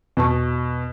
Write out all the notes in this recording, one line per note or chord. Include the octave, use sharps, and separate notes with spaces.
E2 B2 A5 C#6